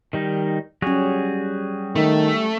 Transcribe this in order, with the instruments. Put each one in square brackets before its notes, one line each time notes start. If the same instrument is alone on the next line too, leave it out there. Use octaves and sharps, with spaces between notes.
[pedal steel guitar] D#3 G3 D#4
[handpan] F#3 C#4 [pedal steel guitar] G3 F#4 G#4
[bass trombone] D#3 [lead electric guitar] A3